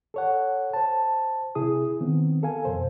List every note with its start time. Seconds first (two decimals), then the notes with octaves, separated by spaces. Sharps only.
0.14 A4 C#5 F#5
0.73 C5 A5
1.55 C3 E4 G#4 D#6
2.00 D#3 B3 C4
2.43 A4 A#4 F5 G#5
2.65 F2 B2 C5